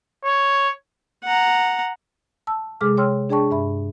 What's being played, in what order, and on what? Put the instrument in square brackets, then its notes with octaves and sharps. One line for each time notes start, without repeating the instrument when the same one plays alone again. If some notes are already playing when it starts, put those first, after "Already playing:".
[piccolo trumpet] C#5
[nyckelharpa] F#5 A#5
[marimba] A5 E6
C3 G#3 G#4 A4 D6 F6
C#5 G5 C6 E6 F6
D4 G#4 D5 G5 A5 C#6
G2 E5 B5